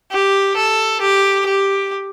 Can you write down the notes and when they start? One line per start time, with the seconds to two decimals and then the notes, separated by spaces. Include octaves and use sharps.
0.12 G4
0.56 A4
1.01 G4
1.46 G4